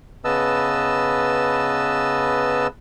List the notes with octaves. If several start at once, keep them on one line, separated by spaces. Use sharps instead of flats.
C#3 B3 B4 D#5 A5 E6